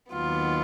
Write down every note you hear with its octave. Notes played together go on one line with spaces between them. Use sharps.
D#2 D#3 F#3 B3 F4